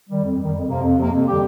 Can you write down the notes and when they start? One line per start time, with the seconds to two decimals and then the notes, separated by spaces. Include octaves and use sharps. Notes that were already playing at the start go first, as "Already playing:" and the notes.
0.09 D#3 G3
0.23 F2
0.38 D#3 G3
0.53 F2
0.67 C3 F3 A#3
0.82 F2
0.97 C3 F3 A#3
1.11 F2
1.26 D3 G3 C4 G4